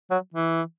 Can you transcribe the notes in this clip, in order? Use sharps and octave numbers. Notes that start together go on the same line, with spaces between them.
F#3
E3